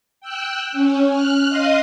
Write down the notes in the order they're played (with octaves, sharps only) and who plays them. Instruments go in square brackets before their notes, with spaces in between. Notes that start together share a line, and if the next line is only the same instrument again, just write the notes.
[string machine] G5 E6 F#6
C#4
F6 F#6
D#5 F5 C6 D#6